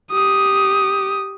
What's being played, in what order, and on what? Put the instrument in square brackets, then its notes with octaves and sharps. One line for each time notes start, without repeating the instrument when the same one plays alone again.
[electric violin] G4 D#6